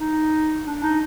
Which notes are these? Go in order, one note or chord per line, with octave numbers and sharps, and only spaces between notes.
D#4
D4
D#4